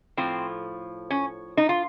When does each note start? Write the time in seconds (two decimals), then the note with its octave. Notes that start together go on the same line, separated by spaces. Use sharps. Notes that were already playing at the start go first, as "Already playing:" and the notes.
0.17 A2 F3 C4
1.10 C#4
1.57 D#4
1.69 F4